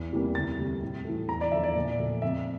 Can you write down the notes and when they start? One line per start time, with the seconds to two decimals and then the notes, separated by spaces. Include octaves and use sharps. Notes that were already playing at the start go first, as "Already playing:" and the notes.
Already playing: E2
0.12 C3 E3 G3 A#3
0.35 D2 A6
0.59 C3 G3
0.82 A2
1.05 E3 A3
1.28 E2 A#5
1.41 D5
1.52 D3 F3 E5
1.63 D5
1.75 A#2
1.99 F3 A3
2.22 F2 E5